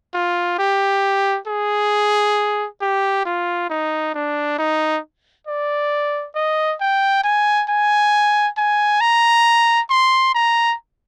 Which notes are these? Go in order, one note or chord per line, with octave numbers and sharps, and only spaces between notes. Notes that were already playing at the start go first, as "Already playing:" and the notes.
F4
G4
G#4
G4
F4
D#4
D4
D#4
D5
D#5
G5
G#5
G#5
G#5
A#5
C6
A#5